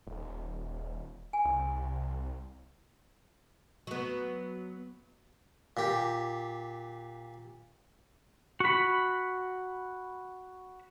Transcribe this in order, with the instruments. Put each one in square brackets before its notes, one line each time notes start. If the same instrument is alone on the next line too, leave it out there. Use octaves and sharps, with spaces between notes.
[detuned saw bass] D#1
[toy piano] G#5
[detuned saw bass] C2
[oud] F#3 B3
[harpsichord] A#2 G4
[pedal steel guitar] F#4 B5